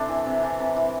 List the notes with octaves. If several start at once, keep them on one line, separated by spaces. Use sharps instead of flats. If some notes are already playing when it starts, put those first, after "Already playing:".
Already playing: C3 D4 E4 A4 C5
E3
C3
E3
C3
E3